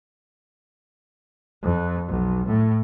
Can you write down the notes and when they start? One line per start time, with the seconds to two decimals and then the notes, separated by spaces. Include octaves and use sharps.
1.63 F2
2.08 B1
2.47 A2